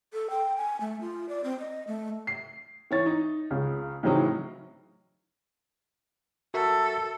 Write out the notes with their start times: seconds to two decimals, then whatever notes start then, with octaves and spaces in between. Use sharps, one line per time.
0.13 A4
0.30 G5
0.57 G#5
0.81 A3
1.01 F4
1.29 D5
1.44 C4
1.59 D#5
1.87 A3
2.27 C7
2.91 E3 C#5 A6
3.06 D#4
3.51 C#2 C#3
4.03 A2 C#3 E3 F#3 C4 D#4
6.54 F#4 A4 A#4 E5